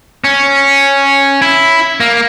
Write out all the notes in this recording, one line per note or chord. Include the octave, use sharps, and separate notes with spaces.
C#4
E4
A#3